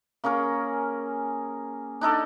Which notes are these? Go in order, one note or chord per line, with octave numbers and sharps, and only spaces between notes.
A#3 C#4 G#4 A#4
D4 D#4 A4 D5